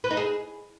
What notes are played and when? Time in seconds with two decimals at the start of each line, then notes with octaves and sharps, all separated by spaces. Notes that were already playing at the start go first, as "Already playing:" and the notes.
0.04 B4
0.11 D#4
0.17 G#4